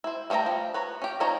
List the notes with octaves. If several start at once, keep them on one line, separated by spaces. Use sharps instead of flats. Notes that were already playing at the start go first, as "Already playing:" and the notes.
E4 C5
G3 A3 C5 G5 A#5
F3
B4 C#5 A#5
C#4 G4
F3 G3 D#4 C#5 A#5